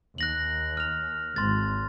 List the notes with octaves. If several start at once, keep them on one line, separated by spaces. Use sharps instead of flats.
D#2 F#6 A#6 F#7
F6 F7
G#1 C6 A6